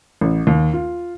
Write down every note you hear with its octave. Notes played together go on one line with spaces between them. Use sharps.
A1
D#2
F4